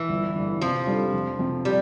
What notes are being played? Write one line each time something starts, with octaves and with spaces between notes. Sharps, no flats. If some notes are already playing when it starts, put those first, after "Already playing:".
Already playing: E3
G1
G2 D3
C3 F3
G3 D4 F4 A4
F1
F2 C3
G3